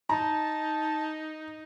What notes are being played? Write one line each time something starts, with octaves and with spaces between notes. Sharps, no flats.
D#4 A5 A#5